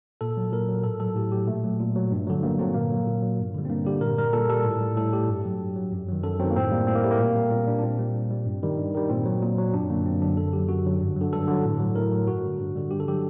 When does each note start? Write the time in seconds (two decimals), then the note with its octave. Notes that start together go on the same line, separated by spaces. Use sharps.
0.21 A#2 A4
0.37 F#3
0.52 A#2 A#4
0.68 F#3
0.84 A2 A4
1.00 F#3 A4
1.15 A2 G4
1.32 F#3 G4
1.47 A#2 A3
1.64 F#3
1.80 A#2
1.95 F#3
2.11 G2
2.27 D3 F#3
2.43 G2 A#3
2.59 D3 F#3 C4
2.75 A#2 A#3
2.91 F#3
3.07 A#2
3.22 F#3
3.39 G2
3.54 D3 G3
3.65 C4
3.69 G2 A#3
3.85 D3 G3 G4
4.01 A#2 A#4
4.18 G3 A#4
4.33 A#2 A4
4.49 G3 A4
4.65 A2
4.81 G3
4.97 A2 A4
5.12 G3 G4
5.28 G2
5.45 F#3
5.61 G2
5.76 F#3
5.92 F#2
6.08 D#3 F#3
6.24 F#2 A4
6.39 D#3 F#3 C4
6.51 A#3
6.56 A2 C4
6.72 G3 A#3
6.87 A2 C4
6.95 A#3
7.03 G3 A3
7.11 A#3
7.19 A#2
7.35 G3
7.51 A#2 C4
7.67 G3 D4
7.79 D4
7.83 A#2 C4
7.99 G3 A#3
8.15 A#2
8.31 G3
8.46 G2
8.63 D#3 G3
8.78 G2
8.94 D#3 G3
9.10 A#2 C4
9.26 F#3
9.42 A#2
9.58 F#3
9.73 F#2 D4
9.90 D3 F#3 A#3
10.06 F#2 C4
10.22 D3 F#3 D4
10.37 F#2 A4
10.53 D3 F#3 G4
10.69 F#2 F#4
10.85 D3 F#3
11.00 G2
11.16 D3 F#3
11.32 G2 A4
11.48 D3 F#3
11.64 A2
11.80 F#3
11.95 A2 A#4
12.12 F#3
12.27 G2 F#4
12.43 D3 G3
12.60 G2
12.76 D3 G3
12.91 G2 G4
13.00 A4
13.07 D3 F#3 G4